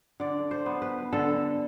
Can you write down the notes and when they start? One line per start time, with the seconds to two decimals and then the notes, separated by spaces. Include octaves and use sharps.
0.20 D3 D5
0.51 C5
0.66 B3
0.82 B4
1.12 D3 A4